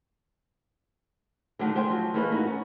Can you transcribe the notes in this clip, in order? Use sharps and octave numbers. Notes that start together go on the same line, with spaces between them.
D3 D#3 F#3 A3
G4 C5 G5 G#5
F3 F#3
E3 A3 A#3 G4 B4 D#5
D#4 E4 F#4
C#4